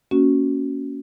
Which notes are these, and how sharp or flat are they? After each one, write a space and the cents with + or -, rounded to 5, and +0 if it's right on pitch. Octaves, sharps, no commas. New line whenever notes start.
A#3 +0 C#4 +10 F#4 +0